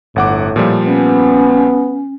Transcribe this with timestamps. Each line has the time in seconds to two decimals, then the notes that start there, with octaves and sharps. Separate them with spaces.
0.16 G1 A2 F#5 D6
0.56 A#2 F3 G3
0.87 B3 C#4